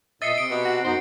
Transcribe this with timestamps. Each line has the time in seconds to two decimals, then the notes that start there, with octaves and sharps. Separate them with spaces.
0.22 A#2 D#5 E5 A6 C7 C#7
0.38 C3 D7
0.51 B2
0.65 F#4
0.84 F#2 B3 D#4 C5